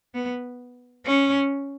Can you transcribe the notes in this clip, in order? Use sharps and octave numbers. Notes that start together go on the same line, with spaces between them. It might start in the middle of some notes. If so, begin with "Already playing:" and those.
B3
C#4